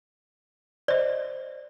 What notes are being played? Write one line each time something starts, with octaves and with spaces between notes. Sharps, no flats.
C5 D5 D#5